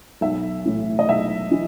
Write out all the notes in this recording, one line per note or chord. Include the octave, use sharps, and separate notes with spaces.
B1 E5
A2 E3
D#5
B1 E5
E3